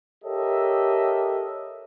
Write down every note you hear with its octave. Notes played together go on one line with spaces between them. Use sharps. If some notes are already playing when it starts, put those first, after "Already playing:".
G4 A4 A#4 C#5 D#5 E5